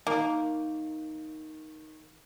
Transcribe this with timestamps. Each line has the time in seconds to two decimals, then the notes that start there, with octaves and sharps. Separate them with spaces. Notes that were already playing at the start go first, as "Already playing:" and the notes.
0.07 D#3 A#3